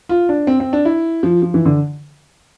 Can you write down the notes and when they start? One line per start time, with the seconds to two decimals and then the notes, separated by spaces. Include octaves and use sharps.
0.09 F4
0.29 D4
0.47 C4
0.60 C4
0.73 D4
0.85 E4
1.23 F3
1.42 F3
1.54 E3
1.65 D3